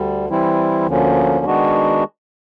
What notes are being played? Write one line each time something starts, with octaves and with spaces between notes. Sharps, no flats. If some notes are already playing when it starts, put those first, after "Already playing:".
Already playing: D2 D3 G3
E3 G3 C4 E4
D2 D3 F3 A#3 C#4
D#3 G#3 B3 D4 F#4